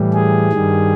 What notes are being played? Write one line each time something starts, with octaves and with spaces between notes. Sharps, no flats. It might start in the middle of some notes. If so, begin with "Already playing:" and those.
Already playing: A2 E3 G3
G#4
G2 D#3 G3